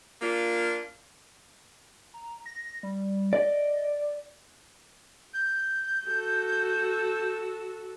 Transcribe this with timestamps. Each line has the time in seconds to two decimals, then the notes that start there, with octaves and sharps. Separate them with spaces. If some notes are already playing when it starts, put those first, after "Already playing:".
0.22 A#3 D4 F4
2.14 A#5
2.46 A#6
2.83 G3
3.33 D5 D#5
5.34 G6
6.07 F#4 A4